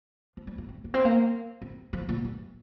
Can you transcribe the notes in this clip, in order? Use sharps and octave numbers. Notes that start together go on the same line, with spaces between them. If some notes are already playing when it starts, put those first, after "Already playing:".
F3
G3
A#3
C4
A#3
C4
A#3
C4
F3
A#2
G2